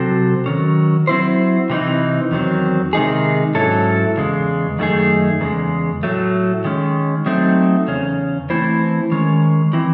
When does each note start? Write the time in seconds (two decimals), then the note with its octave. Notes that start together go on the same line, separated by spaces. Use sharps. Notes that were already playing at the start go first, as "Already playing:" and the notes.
Already playing: C3 F#3 C4 F#4 A4
0.46 D#3 F#3 C#4
1.07 F#3 C4 E4 C5
1.70 C3 E3 A3 C4 D#4
2.32 E2 D#3 F#3 C4
2.93 C3 D#3 G#3 D#4 G#4
3.55 G#2 F#3 C#4 E4 A4
4.17 E2 C#3 G#3
4.79 F#2 D#3 A3 D#4 G#4
5.41 E2 C#3 G#3
6.03 A2 F#3 A3
6.65 D#3 G#3 C#4
7.26 F#3 A3 C4 D#4
7.88 E2 C#3 C#4
8.50 E3 A3 C4 E4 C5
9.12 D#3 G#3 C#4
9.73 E3 C4 E4